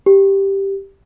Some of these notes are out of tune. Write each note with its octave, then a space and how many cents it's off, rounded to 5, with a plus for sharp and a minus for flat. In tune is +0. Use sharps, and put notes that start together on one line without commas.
G4 +0